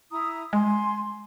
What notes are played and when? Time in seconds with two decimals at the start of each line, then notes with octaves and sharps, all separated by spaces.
0.11 E4 A#5 D#6
0.53 G#3 G#5 C6